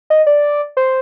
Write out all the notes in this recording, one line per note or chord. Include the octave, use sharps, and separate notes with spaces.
D#5
D5
C5